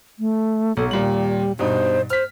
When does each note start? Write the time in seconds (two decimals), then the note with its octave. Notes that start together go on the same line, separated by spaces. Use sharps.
0.19 A3
0.77 B1 A4
0.91 D#2 A#2 G3 F#7
1.59 G2 B2 D#4 C5
2.10 C5 F6 B6